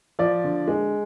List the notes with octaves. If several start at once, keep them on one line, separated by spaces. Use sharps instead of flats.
F3 D5
D3
G#3